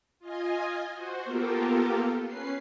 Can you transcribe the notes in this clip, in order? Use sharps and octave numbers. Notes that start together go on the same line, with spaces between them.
F4 D#5 G#5
F#4 C5
A#3 B3 F4 G4 A4 A#4
C#4 B4 C7